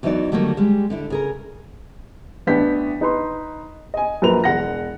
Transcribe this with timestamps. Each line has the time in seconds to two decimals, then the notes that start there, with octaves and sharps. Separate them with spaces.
0.03 E2 E3 F#3 A#3 D#4 D5
0.32 D3 D#3 F#3 G3 A3 A#3
0.57 G3 G#3 G4
0.90 D3 D4 E4
1.10 C#3 G#4 A#4
2.47 A1 B3 D4 E5 G6 B6
3.01 D#4 B4 C6
3.94 D#5 G#5
4.22 F#2 A#2 F3 A#4 B4 F7
4.44 E1 F#5 A#6